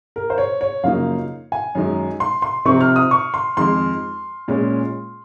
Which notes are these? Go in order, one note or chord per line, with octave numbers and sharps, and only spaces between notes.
A#4
C5
C#5
C#5
F#2 C#3 F3 A#3 D#4 F5
G#5
F#2 D#3 G#3 D#4
C6
C6
C3 F3 C4 D#4 C#6
F6
D#6
C#6
C6
F2 D#3 G#3 C6
A#2 G#3 C#4